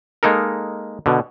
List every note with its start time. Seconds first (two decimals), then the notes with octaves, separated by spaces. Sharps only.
0.23 G#3 A#3 D#4 A4 A#4
1.06 B2 D3